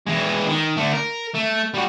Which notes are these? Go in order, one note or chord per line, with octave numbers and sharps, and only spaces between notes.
E3 G#3
D#3
D3 A3
A#4
A3
G3 F#4